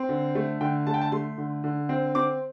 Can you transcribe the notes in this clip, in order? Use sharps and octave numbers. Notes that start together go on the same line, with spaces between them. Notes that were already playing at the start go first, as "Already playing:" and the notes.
Already playing: C4
D3
A3
D3 G5
A3 A5
G5
A5
A3 C6
D3
D3
C4
C4 D6